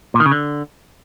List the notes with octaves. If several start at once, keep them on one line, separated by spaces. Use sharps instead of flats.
A#2
D#3
C#3
D3